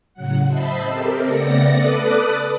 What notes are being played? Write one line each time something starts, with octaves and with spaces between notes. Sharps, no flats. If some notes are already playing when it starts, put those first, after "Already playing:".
A2 C#3 F#3 F#5
C5 D#5 E5 A5 B5 C6
C4 G4 A4 A#4
C#3 A3 B3 D5 A#6 C#7
A4 B4 D5 D6 D#6 F#6